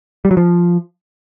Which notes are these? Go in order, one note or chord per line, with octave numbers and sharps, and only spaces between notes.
G3
F#3
F3